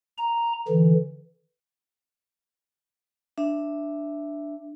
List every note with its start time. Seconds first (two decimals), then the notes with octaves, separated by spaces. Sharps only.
0.18 A#5
0.68 D3 E3
3.38 D4 E5